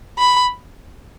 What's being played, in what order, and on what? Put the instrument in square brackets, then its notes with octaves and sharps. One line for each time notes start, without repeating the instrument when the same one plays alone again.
[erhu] B5